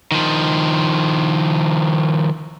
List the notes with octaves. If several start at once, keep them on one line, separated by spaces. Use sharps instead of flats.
D#3 F3